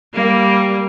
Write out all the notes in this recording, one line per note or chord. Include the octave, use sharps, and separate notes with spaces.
G3 A#3